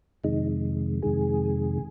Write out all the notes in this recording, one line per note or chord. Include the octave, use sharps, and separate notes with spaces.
F2 C3 D#3 G#3 D#4
F2 C3 D#3 G#3 G#4